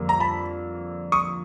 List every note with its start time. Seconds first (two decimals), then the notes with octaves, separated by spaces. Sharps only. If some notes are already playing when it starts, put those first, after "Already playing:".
Already playing: F2 D3 G3 A#3
0.09 A#5
0.20 A5 B5
1.12 C#6 D#6